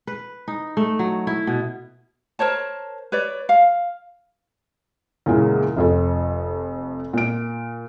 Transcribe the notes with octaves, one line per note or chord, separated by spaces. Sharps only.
B4
D#4
A3
F#3
E4
B2
A#4 C5 C#5 A5
B4 C#5 D5
F5
E2 A#2 C#3 G#3 A#3
F1 F2 A4
A#2 D7